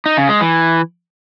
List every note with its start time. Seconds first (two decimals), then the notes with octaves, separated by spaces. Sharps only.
0.06 D#4
0.17 C#3
0.29 G#3
0.41 E3